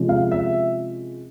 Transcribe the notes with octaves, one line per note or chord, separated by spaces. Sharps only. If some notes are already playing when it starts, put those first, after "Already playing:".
Already playing: C3 F3 G#3 C#4
F5
E5